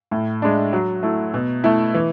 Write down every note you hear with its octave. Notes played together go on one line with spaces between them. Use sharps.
A2
G#3 D4
F#3
A3 E4
B2
A3 E4
E3